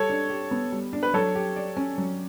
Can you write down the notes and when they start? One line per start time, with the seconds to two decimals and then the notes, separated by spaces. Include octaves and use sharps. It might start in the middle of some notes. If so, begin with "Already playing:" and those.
Already playing: G3 A4 C#5
0.10 D4
0.30 G4
0.51 B3
0.72 G3
0.93 D4
1.03 B4
1.14 F#3 A4 C#5
1.35 G4
1.56 D5
1.77 C#4
1.98 F#3